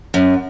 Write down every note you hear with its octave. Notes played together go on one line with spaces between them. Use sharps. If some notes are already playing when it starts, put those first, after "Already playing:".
F#2